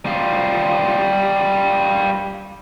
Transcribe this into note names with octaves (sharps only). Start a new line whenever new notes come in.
G3 F4